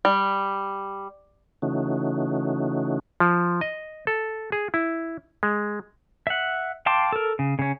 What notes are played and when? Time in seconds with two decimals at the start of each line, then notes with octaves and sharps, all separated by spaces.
0.05 G3
1.62 C#3 E3 A3 C#4 D#4 F#4
3.20 F3
3.61 D#5
4.07 A4
4.52 G#4
4.74 E4
5.43 G#3
6.27 E5 F#5
6.86 F5 G5 A5 C6 D6
7.12 A4 A#4
7.39 C#3
7.59 C#3 C#4